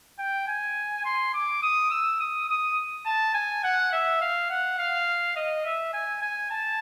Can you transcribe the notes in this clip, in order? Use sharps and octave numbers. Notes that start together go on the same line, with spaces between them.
G5
G#5
C6
D6
D#6
E6
D#6
D#6
A5
G#5
F#5
E5
F5
F#5
F5
D#5
E5
G#5
G#5
A5